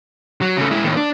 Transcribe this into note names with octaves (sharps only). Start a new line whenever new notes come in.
F#3
C#3 A3
G#3 E4
A2 D#3
D4